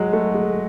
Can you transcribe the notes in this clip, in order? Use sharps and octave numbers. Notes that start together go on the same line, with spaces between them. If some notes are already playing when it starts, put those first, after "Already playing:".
Already playing: F#3 G#3
A3
G#3